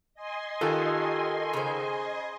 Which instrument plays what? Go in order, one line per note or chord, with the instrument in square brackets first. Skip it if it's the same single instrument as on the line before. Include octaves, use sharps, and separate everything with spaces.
[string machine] D#5 G#5 C6
[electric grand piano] D#3 F4 A4 [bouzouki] G4 F#5
[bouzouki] C#3 C5